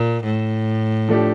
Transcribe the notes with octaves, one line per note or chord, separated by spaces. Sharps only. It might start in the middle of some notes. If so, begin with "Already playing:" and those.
Already playing: A#2
A2
F3 A3 D4 G4